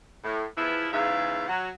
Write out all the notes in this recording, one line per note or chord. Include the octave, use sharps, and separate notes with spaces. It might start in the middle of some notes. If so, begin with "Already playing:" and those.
A2
E2 F3 B3 E4
E2 G#2 C#3 E3 E5 F5
F#3 F#5